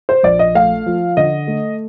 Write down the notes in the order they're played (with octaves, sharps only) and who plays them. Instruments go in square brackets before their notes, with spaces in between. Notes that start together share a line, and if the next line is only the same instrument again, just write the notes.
[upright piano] C5
[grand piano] A#1 [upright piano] D5
[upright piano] D#5
[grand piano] A3 [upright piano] F5
[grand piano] F3
[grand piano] D3 [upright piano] D#5
[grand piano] A3